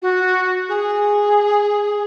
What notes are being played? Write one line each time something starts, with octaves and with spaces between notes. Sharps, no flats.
F#4
G#4